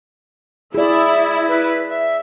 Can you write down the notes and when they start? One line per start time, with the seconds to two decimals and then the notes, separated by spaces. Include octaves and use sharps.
0.75 E4 G#4 D5
1.48 B4
1.89 E5